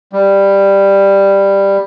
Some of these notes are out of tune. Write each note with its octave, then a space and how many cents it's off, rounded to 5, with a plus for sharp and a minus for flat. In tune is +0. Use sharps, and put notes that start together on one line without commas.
G3 +10